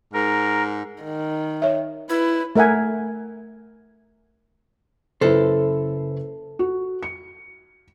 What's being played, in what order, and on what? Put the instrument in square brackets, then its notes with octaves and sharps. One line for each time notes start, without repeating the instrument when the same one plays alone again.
[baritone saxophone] G#2 [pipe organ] A#4
[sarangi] D#3
[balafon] C#5 E5
[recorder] E4 [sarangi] B4
[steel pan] A3 A#4 E5 F#5 G#5
[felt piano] F#1 E4 B4 [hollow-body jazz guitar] A4 C5
[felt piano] F#4
C#7